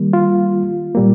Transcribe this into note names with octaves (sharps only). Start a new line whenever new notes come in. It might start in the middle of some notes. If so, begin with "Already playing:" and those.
Already playing: D#3 G3 A#3
F4
A#2 G3 A#3